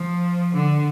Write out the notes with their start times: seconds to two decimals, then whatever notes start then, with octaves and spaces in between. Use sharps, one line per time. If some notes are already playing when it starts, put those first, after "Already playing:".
Already playing: F3
0.54 D3